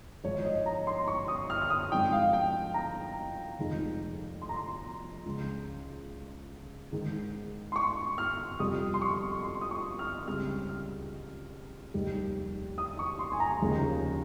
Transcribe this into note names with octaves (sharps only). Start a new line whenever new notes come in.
G#1 G#2 F3 C#5
D#5
A#5
C6
C#6
D#6
F6
F6
D#6
G#2 F3 G#3 C4 D#4 G5
F5
G5
A#5
F1 F2 D#3 G#3 D#4
C6
A#5
C6
C#2 C#3 G#3
G#2 D#3 G#3 D#4
C6
C#6
F6
F2 C3 G3 D#6
C6
C#6
C6
D#6
C#6
F6
C#2 C#3 G3 C4 F6
F6
F1 D#2 D#3 G3
D#6
C#6
C6
G#5
A#5
F1 D#2 C#3 F3 A#3